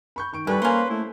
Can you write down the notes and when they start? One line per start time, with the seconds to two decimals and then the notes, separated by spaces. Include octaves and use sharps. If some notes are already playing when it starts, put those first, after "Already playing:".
0.16 B5 C#6 G6
0.32 D#3 C#6 D7
0.47 E3 G3 A4 B4 C#6
0.62 A#3 C#4 C5
0.90 A3 E4